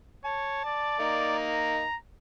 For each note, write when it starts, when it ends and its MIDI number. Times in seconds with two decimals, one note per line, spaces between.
0.25 0.60 73
0.25 0.95 81
0.65 1.34 74
1.00 1.82 58
1.00 1.82 63
1.39 1.96 82